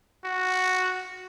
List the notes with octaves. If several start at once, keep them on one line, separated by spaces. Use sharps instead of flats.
F#4